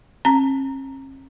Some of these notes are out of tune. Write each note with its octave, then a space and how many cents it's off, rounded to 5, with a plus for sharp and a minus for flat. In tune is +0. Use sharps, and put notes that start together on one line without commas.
C#4 -45 A#5 +0